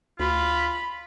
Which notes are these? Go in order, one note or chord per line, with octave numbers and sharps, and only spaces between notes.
D2 F4 B5